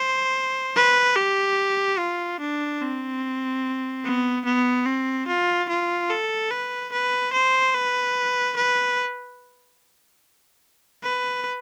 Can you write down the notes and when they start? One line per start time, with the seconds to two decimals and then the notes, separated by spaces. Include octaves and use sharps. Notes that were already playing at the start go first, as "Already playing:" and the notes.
Already playing: C5
0.76 B4
1.17 G4
1.99 F4
2.40 D4
2.82 C4
4.05 B3
4.45 B3
4.86 C4
5.28 F4
5.69 F4
6.10 A4
6.51 B4
6.93 B4
7.33 C5
7.74 B4
8.57 B4
11.04 B4